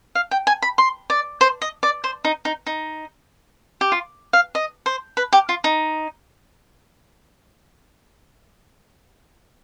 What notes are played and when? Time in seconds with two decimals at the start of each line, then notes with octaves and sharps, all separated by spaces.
0.15 F5
0.31 G5
0.47 G#5
0.62 B5
0.78 C6
1.10 D5
1.41 C5
1.62 D#5
1.83 D5
2.04 C5
2.25 D#4
2.45 D#4
2.66 D#4
3.81 G4
3.92 F4
4.33 F5
4.55 D#5
4.86 C5
5.17 B4
5.33 G4
5.49 F4
5.64 D#4